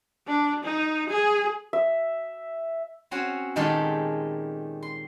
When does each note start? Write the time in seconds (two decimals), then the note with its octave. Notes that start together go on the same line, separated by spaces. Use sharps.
0.27 D4
0.64 D#4
1.09 G#4
1.73 E5
3.11 C4 C#4 F#4 C#5
3.56 A#2 D#3 G#3 D#4 G4 A4
4.83 C6